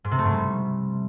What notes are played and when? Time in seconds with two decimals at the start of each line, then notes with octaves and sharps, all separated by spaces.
0.04 G#2
0.11 C3
0.18 A3
0.25 G#2
0.32 G3